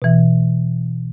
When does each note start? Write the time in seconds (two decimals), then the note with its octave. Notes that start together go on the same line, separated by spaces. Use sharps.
0.02 B2 E3